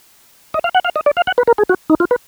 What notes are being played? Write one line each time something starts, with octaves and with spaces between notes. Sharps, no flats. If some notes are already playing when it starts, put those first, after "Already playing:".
D#5
F5
F#5
F5
D#5
D5
F5
F#5
B4
A#4
G#4
F#4
D#4
F4
B4